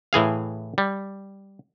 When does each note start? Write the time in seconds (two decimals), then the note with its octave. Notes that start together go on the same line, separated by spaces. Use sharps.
0.13 A2 E3 G#4 F5
0.78 G3